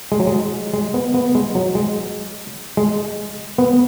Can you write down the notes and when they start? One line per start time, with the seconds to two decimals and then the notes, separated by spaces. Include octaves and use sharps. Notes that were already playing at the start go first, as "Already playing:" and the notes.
0.12 G#3
0.20 F#3
0.27 G#3
0.74 G#3
0.94 B3
1.14 B3
1.35 G#3
1.55 F#3
1.75 G#3
2.77 G#3
3.58 B3